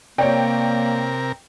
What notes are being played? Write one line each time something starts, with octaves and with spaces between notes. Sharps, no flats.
C3 A#3 A#4 C#5 D5 G5